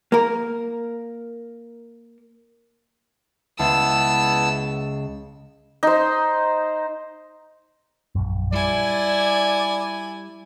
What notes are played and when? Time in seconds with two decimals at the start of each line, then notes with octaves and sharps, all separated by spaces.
0.12 A#3 A#4
3.59 C#2 B3 E4 A5 E6
5.83 D#4 C5
8.15 A#1 F#2
8.53 G3 E4 D5 G#5